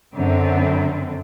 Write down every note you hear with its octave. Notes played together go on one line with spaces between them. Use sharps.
F#2 D3 C4